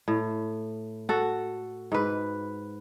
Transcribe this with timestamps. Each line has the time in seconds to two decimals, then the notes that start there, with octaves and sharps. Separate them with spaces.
0.08 A2
1.09 F#4 A4
1.92 G#2 B4